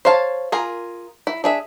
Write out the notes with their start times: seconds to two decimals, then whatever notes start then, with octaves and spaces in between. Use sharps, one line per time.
0.05 C5 C#5 F5 A5
0.52 F4 G#4 A#4
1.27 E4
1.44 D4 G#4 E5